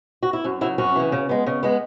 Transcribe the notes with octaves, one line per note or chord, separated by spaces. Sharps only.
F#4
E4
F#2 C#4
C#3 F#3 E4
F#2 C#4 F#4
C#3 E3
C#3
G#3 B3
C#3
G#3 B3